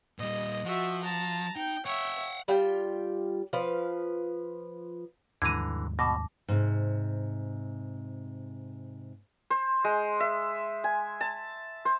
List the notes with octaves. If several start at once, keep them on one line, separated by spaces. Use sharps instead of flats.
A#2 G3 D#5
F3 F#4 E5
A5 A#5
D#4 G5
C#5 E5 F#5 G5
G3 F4 G5
F3 B4 F5
D#2 G#2 D3 E3 G3 A#5 G#6 D#7
B2 A5 D6 A#6
G#2 C3
C5
G#3
E5
G#5
A5
C5